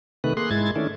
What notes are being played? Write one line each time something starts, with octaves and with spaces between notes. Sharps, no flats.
C3 D#3 A3 B4 F#6
A#3 G#4 C6 F#6
G#2 G#3 E4 G#6 A6
D#3 A3 C#4 D4 E4